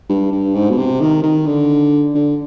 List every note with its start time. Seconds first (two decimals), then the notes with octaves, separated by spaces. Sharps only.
0.09 G2
0.32 G2
0.55 G#2
0.70 B2
0.77 C3
1.00 D#3
1.23 D#3
1.46 D3
2.15 D3